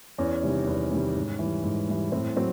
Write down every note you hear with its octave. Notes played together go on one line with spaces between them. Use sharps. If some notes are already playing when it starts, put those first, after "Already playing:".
E2 C#4
C3 D#3 G3
E2
C3 D#3 G3
G#2
E3 G3
G#2
E3 G3
A2 C4
F#3 C4